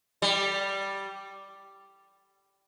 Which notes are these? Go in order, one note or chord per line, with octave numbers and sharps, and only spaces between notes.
G3